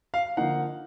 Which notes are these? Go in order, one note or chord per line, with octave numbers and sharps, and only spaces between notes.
F5
D3 F3 A#3 D#4 F#5